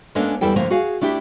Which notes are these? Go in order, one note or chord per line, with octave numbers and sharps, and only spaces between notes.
G#3 A#3 B3 C#4 D4 A4
E2 G3 E4 A4 G5
D3 F3 A3 A#3
F#4 G#4 F5
A3 D4 E4 G4